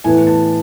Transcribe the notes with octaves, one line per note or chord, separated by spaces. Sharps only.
A2 E3 B3 G#5
A5